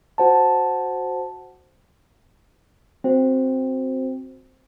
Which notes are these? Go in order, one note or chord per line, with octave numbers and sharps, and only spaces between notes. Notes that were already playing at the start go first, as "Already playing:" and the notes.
F#4 C5 F#5 A5
C4 F#4 C5